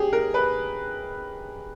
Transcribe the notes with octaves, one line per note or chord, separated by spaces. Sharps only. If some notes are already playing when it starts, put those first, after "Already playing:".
Already playing: G4 G#4
A#4
B4